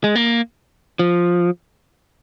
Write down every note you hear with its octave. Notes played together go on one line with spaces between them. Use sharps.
G#3
A#3
F3